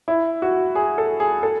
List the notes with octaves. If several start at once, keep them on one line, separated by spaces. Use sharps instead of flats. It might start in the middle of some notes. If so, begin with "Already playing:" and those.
E4
F#4
G#4
A4
G#4
A4